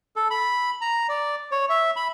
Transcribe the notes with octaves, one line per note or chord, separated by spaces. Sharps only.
A4
B5
A#5
D5
C#5
E5
B5